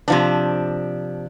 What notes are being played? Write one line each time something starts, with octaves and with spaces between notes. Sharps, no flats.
C3 F3 D4